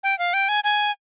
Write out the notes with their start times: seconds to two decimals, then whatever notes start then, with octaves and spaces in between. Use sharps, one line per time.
0.03 G5
0.19 F5
0.34 G5
0.49 G#5
0.64 G#5